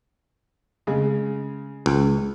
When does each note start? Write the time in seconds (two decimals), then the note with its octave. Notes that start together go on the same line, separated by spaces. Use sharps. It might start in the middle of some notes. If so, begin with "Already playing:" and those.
0.87 C#3 G#3
1.86 C#2